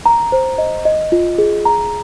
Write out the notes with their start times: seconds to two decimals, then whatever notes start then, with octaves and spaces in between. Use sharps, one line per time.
0.06 A#5
0.32 C5
0.58 D#5
0.85 D#5
1.12 F4
1.38 G#4
1.65 A#5